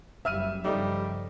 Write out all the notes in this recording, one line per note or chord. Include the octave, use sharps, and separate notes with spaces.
F#1 F#2 G3 E5 F6 D#7
G2 C#3 F3 G3 A3 D#4